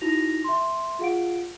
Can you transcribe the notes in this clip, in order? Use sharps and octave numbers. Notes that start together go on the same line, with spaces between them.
D#4 E4 F#4 A#6 F7
E5 C6
F4 G#4 F5 F#5 D7